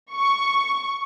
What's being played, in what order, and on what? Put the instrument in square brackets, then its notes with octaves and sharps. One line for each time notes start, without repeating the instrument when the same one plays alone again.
[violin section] C#6